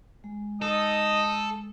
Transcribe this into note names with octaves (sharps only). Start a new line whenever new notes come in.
G#3
D#4 A4 D#6